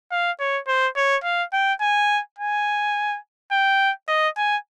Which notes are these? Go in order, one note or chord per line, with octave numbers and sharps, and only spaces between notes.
F5
C#5
C5
C#5
F5
G5
G#5
G#5
G5
D#5
G#5